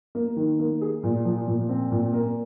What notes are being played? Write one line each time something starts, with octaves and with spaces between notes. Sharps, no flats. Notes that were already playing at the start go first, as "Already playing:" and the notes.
A#3
D#3
A#3
G#4
A#2
F3
A#2
C4
A#2
A#3